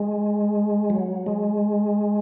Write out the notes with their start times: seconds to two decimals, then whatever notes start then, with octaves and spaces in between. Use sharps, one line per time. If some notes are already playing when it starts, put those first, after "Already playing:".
Already playing: G#3
0.90 F#3
1.26 G#3